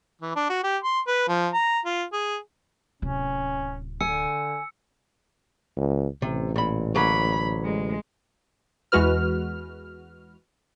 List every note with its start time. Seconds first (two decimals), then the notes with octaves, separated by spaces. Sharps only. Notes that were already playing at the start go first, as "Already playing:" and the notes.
0.22 E3
0.36 D4
0.50 F#4
0.64 G4
0.84 C6
1.07 B4
1.28 F3
1.54 A#5
1.86 F4
2.13 G#4
3.02 D1 C3 C#4
4.01 D3 G#5 E6 C#7
5.77 C#2
6.22 A1 C3
6.56 A#2 B5
6.95 D2 F#3 A#3 B5
7.64 G#3
8.92 E2 E3 G#3 F#4 B4 F6